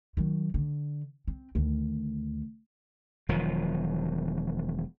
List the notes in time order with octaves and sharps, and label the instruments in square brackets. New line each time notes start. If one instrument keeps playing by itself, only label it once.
[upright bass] D#3 F#3
D3
C4
D2 D#3
[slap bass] E1 D#3 F3 F#3